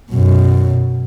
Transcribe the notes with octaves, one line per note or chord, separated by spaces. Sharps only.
F#2 B2